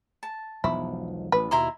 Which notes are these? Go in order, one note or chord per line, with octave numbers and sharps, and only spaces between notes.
A5
E1 B1 F3 E4
A1 B4
D#2 B2 E4 A#5 C6